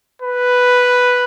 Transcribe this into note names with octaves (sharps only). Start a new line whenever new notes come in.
B4